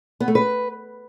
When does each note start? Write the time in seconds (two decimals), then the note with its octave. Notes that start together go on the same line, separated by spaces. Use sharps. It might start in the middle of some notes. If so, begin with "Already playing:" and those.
0.20 B3
0.28 A3
0.35 B4